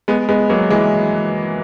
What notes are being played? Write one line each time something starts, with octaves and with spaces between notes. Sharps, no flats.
G#3 B3
G#3 B3
F#3 A#3
E3 G#3